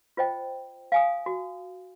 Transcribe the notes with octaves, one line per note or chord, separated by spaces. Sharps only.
F4 C5 D#5 G5
F5 G#5 D#6
F#4